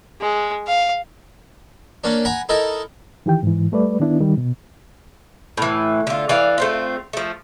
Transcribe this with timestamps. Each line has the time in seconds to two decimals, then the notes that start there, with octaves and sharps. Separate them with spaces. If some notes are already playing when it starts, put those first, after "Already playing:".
0.21 G#3
0.68 F5
2.04 A#3 C#4 D4
2.25 F#5 G#5 A#5 B5
2.49 D#4 E4 A4 A#4
3.26 D#3 E3 G4 G5
3.43 G#2 E3
3.72 G3 A3 B4 D5
4.00 D#3 B3 D4 E4
4.20 D#3 G3
4.37 B2
5.57 A2 E3
6.07 D3 F4
6.29 E3 D5 F5
6.58 A3 C4 F4
7.13 F3 A3